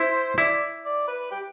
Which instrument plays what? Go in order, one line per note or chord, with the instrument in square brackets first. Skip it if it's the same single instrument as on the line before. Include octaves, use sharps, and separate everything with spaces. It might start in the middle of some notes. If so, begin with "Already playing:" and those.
Already playing: [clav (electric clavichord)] E4 [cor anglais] C5
[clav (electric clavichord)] E4 [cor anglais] D5
[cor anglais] D5
B4
G4